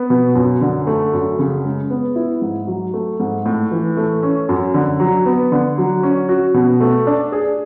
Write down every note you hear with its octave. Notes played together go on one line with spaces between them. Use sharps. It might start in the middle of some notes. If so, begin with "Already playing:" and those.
Already playing: B3
B2
F#2
D3
A3
F#2
C#3
G#3
B3
E4
G#2
F#3
A3
G#2
A2
E3
A3
C#4
F#2
D3
F#3
B3
D3
F#3
C#4
F#4
B2
A3
D4
G#4